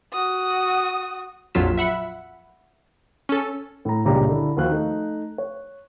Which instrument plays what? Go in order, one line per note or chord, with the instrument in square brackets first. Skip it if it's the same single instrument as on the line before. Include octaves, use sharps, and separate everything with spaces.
[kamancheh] F#4 D#6
[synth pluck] A#1 F2 F#3 F4 B6 E7
E5 F#5 B5 C#7
C#4 A4
[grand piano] A2 A#5
C#2 G2 A#2 C#4 G4 A#5
D3 E4
D#2 F3 F#4 C5 F5 F#6
A3 D#4
C#5